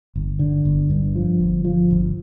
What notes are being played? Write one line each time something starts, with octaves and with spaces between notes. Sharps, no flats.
G1
D3
G1
G2
F3
G1
F3
G1